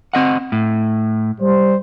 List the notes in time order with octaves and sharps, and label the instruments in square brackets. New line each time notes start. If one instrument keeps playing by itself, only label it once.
[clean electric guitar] C4 D#5 F#5
A2
[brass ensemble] G3 C5